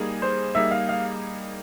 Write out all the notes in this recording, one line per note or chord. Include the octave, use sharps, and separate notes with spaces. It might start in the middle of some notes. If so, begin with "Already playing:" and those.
Already playing: G3 A#3 D#4 G#4
C5
G3 A#3 D#4 G#4 E5
F5
F5